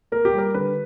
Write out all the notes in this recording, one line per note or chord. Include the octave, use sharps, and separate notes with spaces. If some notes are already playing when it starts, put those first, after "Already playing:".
A#3 A#4
G4
G3 A#4
D3 B4